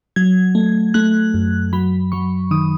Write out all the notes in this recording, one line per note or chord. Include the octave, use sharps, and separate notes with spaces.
F#3 G#6
A3
A3 F#6
F#2
F#3 B5
F#3 C#6
D#3 D#6